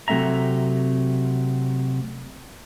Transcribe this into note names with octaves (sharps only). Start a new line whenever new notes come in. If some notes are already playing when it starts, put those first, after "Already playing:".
C3 F#3 A3 C4 E5 A#5